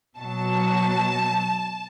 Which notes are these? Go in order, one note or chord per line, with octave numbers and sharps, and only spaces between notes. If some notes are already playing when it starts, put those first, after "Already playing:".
B2 F#3 A5